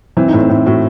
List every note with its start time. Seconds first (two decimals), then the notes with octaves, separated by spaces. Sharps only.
0.17 E3 C4
0.28 D#4
0.33 A2
0.39 C4
0.49 A2 C4
0.66 A2 F#4